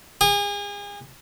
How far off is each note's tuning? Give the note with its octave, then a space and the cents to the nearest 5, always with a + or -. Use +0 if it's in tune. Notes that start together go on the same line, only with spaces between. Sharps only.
G#4 -35